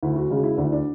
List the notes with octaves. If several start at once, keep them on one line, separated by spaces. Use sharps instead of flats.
D2 E4
F#4
C#3 G#3 F#4
E4
D2 D4
E4
D4